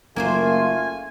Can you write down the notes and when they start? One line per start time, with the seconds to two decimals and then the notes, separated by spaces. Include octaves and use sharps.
0.16 F#1 A3 A#3 F4 G#4 C5 G#5